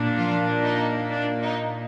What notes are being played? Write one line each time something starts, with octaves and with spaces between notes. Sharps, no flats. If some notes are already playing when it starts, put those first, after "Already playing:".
Already playing: A#2 A#3 D4
F3 F4
D#4
D4
D#4